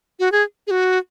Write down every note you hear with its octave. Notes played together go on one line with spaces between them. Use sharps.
F#4
G#4
G#4
F#4